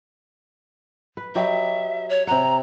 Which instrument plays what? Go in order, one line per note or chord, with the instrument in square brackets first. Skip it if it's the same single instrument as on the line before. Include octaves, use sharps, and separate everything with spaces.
[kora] B4
[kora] F#3 G4 D#5 [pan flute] E5
[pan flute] C#5
[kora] C3 F#5 [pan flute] A#5